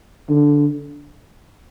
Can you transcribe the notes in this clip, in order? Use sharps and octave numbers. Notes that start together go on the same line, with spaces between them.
D3